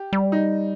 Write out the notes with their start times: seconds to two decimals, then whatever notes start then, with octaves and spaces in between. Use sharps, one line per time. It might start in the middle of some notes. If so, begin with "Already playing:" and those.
Already playing: G4
0.13 G3
0.32 D#4